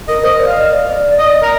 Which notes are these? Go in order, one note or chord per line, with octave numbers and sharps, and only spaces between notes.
A#4 D#5
C5 D#5
D5
F5
D#5
D5
D5 D#5
D#5
A#4